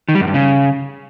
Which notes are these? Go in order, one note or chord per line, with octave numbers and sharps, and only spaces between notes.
D#3
G3
F#2
G2
C#3